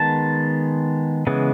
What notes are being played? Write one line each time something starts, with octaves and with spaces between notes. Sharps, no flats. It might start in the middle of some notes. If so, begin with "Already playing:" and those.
Already playing: D#3 G#3 B3 A5
C#3 E3 G#3 B3